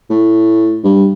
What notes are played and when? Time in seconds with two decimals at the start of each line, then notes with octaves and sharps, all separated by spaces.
0.10 A2
0.84 G2